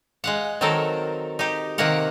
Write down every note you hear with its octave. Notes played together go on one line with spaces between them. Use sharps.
G#3 F5 F#5
D#3 F#3 C4 A4 A#4
D#4 G4
C3 D#3 A#3 A#4 F#5